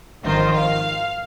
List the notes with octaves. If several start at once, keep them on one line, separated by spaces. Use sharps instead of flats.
G#1 D#3 F3 F4 C5
F5